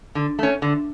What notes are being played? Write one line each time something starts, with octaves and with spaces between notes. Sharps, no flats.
D3
A3 C#4
D3